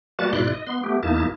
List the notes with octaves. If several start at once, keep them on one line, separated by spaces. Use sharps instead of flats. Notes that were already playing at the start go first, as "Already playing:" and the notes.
G3 A#3 F#4 B4 A5 A6
G#2 B2 E4 D5 C6 F#6
D#5
B3 C6
A3 B3 G4
E2 A#3 D#4 E4 A5